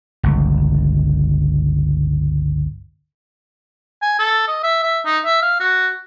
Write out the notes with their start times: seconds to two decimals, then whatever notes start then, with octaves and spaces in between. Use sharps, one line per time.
0.23 G1 C#2
4.02 G#5
4.19 A4
4.48 D#5
4.64 E5
4.83 E5
5.06 D#4
5.25 E5
5.42 F5
5.60 F#4